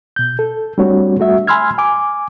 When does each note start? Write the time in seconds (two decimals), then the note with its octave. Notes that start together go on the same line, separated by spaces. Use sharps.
0.16 B2 G6
0.39 A4
0.78 G3 A3 C4 D4 F#4 C#5
1.18 G3 A3 F#4 E5
1.47 G#5 B5 C6 E6 F6 G#6
1.78 G#5 D6